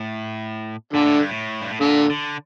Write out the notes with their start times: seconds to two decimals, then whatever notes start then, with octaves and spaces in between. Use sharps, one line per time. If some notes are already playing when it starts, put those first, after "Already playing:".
Already playing: A2
0.93 A#2 D3
1.06 A2
1.18 G2
1.30 A2
1.61 G2
1.70 A2
1.80 A#2 D3
2.10 D3